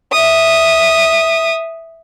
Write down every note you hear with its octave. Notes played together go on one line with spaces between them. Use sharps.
E5 D#6